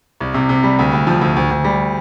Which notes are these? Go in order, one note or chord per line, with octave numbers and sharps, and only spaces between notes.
C2
C3
C3
G3
D2
D2
F3
D2
D2
D2
G3